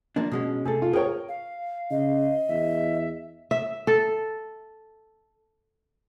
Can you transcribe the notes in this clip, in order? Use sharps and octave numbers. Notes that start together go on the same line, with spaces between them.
F3 A#3 D4
B2 G#3 C#4
C3 A3 G#4 A4
F4
G#4 A#4 C#5 G5
F5
C#3 D#5
E2 E5
E5
A4